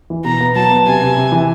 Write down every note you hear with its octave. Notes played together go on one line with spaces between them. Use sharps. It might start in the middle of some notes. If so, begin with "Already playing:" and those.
E3
B2 A#5
B3
F#3 A5
B3
C3 G#5
C3
C3
E3